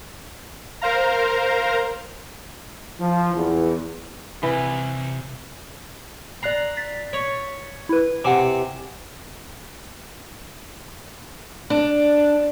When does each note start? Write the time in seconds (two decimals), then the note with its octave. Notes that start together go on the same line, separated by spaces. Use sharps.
0.82 A#4 C5 F5 A#5
3.00 F3
3.35 E2
4.43 C3 E3 B4 B5
6.43 D5 A#5 F#6 C7
6.77 A6 B6
7.13 C#5
7.89 E4 B4
8.24 C3 F#5 G#5 D6
11.70 D4